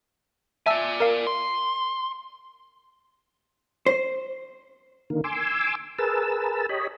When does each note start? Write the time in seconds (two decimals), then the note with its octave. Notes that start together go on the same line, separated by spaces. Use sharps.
0.66 D5 E5 G#5 A5 E6
1.00 A#4 F5
1.27 C6
3.86 C5
5.10 D3 D#3 A#3
5.24 G#5 C6 D6 E6
5.98 G#4 A#4 B4 A5 E6
6.69 G4 C#5 D#5 B5